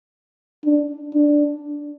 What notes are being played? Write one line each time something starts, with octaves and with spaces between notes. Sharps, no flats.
D4
D4